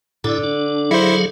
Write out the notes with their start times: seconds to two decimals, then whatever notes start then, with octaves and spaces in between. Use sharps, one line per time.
0.24 A2 D3 E4 D5
0.43 D4
0.91 F#3 E4 G#4 C5 F5